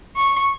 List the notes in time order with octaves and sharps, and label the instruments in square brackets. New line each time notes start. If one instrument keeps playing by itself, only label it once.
[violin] C#6